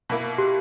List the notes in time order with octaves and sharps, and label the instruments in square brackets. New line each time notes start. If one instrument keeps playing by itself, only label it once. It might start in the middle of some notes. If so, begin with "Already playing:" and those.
[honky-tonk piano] B2 A#3 E4
[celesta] G4